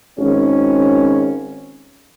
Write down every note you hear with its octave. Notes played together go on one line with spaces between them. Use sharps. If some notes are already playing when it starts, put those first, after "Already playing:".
G#1 C#4